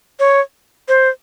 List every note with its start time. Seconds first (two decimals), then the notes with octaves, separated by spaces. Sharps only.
0.20 C#5
0.88 C5